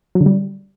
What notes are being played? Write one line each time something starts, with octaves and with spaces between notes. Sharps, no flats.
F#3
D3
G3